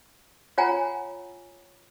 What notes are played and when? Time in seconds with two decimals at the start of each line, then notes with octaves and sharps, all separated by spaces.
0.58 F4 C#5 F#5 G#5 A#5